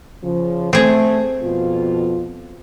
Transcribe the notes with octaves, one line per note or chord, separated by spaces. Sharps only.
C#3 F3
A3 C4 G#4
F2 B2 F4